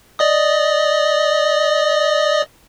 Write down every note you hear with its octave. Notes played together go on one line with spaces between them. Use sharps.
D5 D#5 D#6